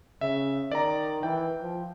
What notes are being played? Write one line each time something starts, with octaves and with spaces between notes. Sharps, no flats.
C#3 E5
D#3 D5 A#5
E3 G5
F3